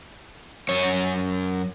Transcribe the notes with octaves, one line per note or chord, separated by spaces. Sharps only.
F#2 C#5